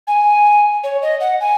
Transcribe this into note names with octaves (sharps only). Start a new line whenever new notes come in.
G#5
C#5
D#5
F#5
G#5